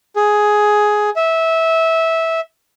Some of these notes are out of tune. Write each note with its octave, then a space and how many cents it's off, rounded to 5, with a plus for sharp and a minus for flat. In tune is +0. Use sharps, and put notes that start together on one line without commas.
G#4 +10
E5 -15